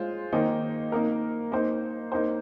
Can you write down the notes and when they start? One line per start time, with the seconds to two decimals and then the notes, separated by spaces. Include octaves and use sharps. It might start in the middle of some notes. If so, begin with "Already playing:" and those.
Already playing: G#3 F4 C5
0.32 D#3 A#3 D#4 C5
0.92 A#3 D#4 A#4
1.52 A#3 D#4 C5
2.12 A#3 D#4 C5